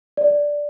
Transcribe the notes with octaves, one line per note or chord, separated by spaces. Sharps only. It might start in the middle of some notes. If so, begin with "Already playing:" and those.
D5